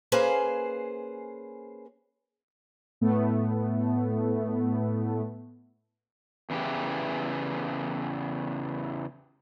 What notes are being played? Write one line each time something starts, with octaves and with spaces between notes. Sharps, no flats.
A#3 C#4 G#4 B4 C5 F5
A2 A3 B3
E2 C#3 E3 G4